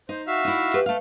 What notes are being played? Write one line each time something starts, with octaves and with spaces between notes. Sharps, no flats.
D#4 C5
F#4 E5 F5
D#4 E4
G4 B4
A3 F5